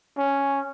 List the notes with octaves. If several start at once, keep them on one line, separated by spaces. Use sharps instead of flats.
C#4